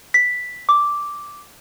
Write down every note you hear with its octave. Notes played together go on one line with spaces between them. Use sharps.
B6
D6